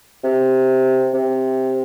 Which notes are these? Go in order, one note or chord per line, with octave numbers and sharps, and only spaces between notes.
C3
C3